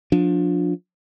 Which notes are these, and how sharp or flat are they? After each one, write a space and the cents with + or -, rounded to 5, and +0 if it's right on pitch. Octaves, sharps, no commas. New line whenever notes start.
F3 +25 D4 +0